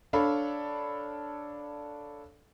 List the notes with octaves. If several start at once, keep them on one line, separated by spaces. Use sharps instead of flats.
D4 A4 C#5 F5 B5